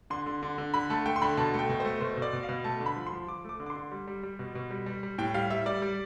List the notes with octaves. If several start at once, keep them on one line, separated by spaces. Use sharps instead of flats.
D3 C6
D3
D3
D3
D3 B5
A3 A5
A3 G5
C6
D3 B5
B2 A5
A3
G5
B2
A3 C5
B2 C5
B2 D5
B2
F5
B2
A3 A5
D3
B5
F3
C6
F3
F3 D6
A3 D6
D3
D6
C6
D3
G3
G3
G3
B2
B2
G3
G3
G3
A2 G5
G3 F5
G3 E5
G3 D5
G3